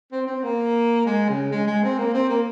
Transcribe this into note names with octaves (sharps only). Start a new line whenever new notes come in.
C4
C4
A#3
G#3
C#3
G#3
G#3
C4
A#3
C4
A#3